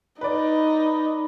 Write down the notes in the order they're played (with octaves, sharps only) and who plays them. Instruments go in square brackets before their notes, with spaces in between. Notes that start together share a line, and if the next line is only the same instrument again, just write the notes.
[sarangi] D#4 [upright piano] B4 D5